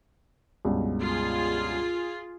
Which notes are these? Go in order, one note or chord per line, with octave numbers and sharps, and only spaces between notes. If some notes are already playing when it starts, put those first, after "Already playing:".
C#2 G2 B2
F4 G#4